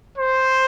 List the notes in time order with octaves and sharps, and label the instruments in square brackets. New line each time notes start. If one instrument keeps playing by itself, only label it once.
[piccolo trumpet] C5